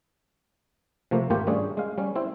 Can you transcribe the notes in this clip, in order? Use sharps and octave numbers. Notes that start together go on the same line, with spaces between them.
C3 F3 A3 A#3
G#1 A3 A#3 F4 G4 G5
G3 A3 C#4 D4 G#4 C#5
G#3 F5
G3 C#4
C4 E4